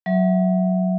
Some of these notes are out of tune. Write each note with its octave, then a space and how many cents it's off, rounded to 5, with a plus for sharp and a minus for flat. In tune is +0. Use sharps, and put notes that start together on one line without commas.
F#3 -5 E5 +0